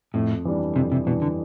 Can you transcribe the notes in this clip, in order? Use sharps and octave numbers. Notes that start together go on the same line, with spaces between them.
F2 A2
E3 G3 D4
F2 C3
C3
B2 E3 G3 D4
D3